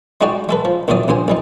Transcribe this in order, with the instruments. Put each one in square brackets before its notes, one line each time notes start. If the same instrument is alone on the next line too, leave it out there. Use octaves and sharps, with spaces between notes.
[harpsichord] G3 G#3 D#4 F#4 G4 D5
G#3 A4 B4
F3
A#1 E2 A2 F#3 D5 D#6
A#1 G2 C5 G#5
A1 G3 D#4